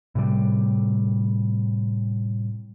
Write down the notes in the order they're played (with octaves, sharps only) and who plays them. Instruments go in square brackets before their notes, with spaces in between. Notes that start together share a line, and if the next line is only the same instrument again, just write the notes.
[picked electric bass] A2 C3 G3